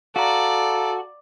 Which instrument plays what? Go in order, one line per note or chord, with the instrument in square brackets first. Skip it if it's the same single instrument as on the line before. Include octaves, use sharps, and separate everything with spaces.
[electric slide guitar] F#4 [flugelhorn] A4 [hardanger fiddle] D5 [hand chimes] F5 A#5